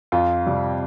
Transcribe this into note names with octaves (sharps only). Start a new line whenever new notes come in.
F2 F4
C3 G3